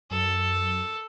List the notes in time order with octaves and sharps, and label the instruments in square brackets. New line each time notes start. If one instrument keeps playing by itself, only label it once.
[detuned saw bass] F#2 [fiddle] A4